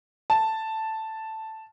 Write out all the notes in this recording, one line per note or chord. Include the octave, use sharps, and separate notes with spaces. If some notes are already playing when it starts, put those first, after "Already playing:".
A5